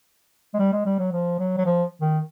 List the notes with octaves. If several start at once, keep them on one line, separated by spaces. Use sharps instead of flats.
G#3
G3
G#3
G3
F#3
F3
F#3
F#3
F3
D#3